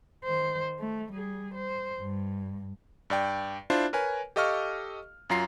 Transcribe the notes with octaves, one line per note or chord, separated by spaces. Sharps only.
D#3 C5
A3
G3 G#4
C5
G2
G2 D5 G5
D4 E4 F4 C5
A#4 B4 C#5 G#5
G4 A4 D#5 F5 C#6 F6
F#2 F#3 F4 A#5 C7